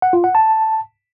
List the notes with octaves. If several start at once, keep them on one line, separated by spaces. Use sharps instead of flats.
F#5
F4
F#5
A5